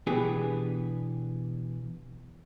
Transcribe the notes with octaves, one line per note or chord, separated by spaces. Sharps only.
B2 E3 B3 D4 G4 G#4